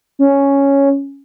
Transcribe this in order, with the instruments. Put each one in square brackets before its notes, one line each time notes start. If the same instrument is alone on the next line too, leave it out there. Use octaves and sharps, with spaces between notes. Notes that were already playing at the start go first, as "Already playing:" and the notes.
[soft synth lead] C#4